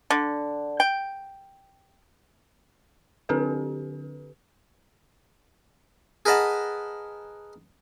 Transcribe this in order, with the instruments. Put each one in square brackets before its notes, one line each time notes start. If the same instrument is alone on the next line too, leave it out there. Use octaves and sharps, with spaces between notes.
[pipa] D3
G5
[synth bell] D3 C4 D4 G4 A4 B4
[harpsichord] G#4 A#4 B4 D#5 F#5 A5